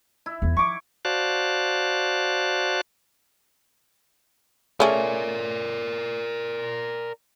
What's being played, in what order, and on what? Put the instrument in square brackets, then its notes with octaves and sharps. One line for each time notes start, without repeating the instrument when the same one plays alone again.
[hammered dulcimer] E4
[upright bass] E2 B3
[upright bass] F3 [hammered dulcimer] C#6 D6
[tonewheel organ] F#4 C5 D5 F5 A5 F#6
[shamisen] A3 C#4 G#4 [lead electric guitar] A#4 D5